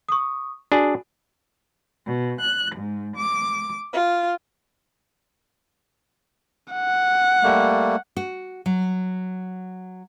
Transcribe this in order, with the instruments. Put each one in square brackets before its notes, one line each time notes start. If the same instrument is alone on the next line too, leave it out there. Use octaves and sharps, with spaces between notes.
[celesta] C#6 D#6
[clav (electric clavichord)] D4 G#4 [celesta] F#4
[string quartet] B2
F#6
G#2
D6
F4
[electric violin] F#5
[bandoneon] G3 A3 A#3
[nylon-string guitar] F#4
F#3